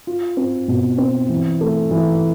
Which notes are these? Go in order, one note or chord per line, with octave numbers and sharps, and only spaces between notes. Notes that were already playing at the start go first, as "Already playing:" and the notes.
F4
C4
B2
C4
E3
A3
E3